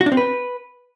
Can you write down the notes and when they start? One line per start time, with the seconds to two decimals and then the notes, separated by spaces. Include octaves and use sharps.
0.01 F#4
0.06 D4
0.12 C4
0.17 B4